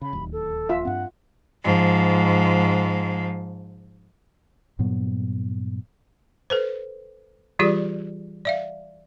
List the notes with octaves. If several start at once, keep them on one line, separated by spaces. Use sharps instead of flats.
C#3 B5
D1 D#2
A4
F4 E5
G2 C4 F#5
G#2 F3
G2 A#2 F#3 B3
A4 B4 C5
E3 G3 F4 G4 G#4 D5
D5 E5 F5